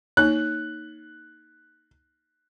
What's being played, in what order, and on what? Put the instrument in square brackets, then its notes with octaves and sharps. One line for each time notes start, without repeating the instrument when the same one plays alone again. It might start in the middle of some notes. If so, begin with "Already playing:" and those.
[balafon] A#3 D#4 C#5 [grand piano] F#6